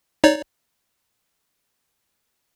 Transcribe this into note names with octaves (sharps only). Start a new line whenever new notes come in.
D#4 C#5 D5